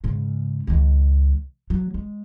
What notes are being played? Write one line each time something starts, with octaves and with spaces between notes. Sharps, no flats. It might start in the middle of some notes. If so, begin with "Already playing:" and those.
G#2 C#3
C#2 D#3
F#3
G#3